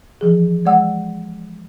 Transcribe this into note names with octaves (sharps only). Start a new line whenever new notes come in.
E3 F3 G#4
G#3 D5 F#5 E6